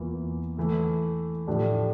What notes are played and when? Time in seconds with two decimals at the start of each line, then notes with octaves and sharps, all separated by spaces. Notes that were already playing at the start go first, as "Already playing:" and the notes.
Already playing: E2 E3 A#3 F4
0.57 E3 A3 E4
1.47 A2 F3 A3 D4 G4